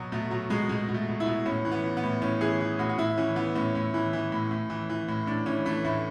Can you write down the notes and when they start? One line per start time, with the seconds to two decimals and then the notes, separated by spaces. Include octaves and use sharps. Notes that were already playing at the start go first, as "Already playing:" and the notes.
Already playing: B2 F#3
0.12 B2 A3
0.31 B2 F#3
0.50 B2 G#3
0.69 B2 G#3
0.88 B2
0.94 A3
1.08 B2
1.20 E4
1.26 B2
1.45 A2 C#4
1.65 E3
1.72 B3
1.84 E3
1.97 B3
2.03 A2
2.22 A2 C#4
2.41 E3 G#4
2.60 E3
2.79 A2 F#4
2.89 F#4
2.98 A2 E4
3.17 E3 C#4
3.36 E3 B3
3.55 A2 C#4
3.75 A2
3.94 E3
4.13 E3
4.32 A2
4.51 A2
4.70 E3
4.90 E3
5.08 A2
5.27 A2 D4
5.46 E3 C#4
5.65 E3 A3
5.84 A2 A3